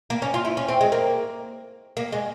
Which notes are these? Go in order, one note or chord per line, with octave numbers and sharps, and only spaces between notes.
A#3
C#4
F4
E4
C#4
C4
G#3
A#3
A#3
G#3